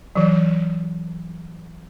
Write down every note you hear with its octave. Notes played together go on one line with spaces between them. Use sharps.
E3 F#3